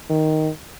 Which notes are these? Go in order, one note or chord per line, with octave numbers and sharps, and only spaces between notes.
D#3